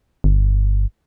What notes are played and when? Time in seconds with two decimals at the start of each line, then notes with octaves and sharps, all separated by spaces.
0.24 G1